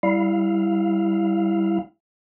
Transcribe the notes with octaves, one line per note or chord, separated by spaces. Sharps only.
G3 E4 F5